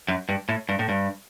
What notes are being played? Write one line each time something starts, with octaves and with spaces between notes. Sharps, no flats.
F#2
G2
A2
G2
A2
G2